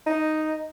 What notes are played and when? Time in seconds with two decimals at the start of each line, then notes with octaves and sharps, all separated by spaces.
0.06 D#4